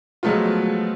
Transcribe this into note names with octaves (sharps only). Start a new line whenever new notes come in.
F3 F#3 G#3 A3 B3 F4